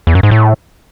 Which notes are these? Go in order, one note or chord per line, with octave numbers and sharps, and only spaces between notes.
E2
F#2
G#2
A2